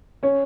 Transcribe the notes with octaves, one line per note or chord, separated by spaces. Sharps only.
C#4 C#5